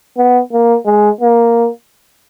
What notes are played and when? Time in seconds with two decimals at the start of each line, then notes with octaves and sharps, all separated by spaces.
0.18 B3
0.53 A#3
0.86 G#3
1.21 A#3